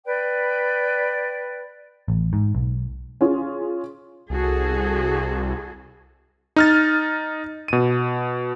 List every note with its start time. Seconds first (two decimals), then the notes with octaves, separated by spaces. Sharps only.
0.05 B4 D5 G5
2.08 A1
2.33 G#2
2.55 B1
3.21 C#4 F4 G#4
4.30 C2 F#4 G#4 A4
6.56 D#4 F6 A6
7.68 B2 D#7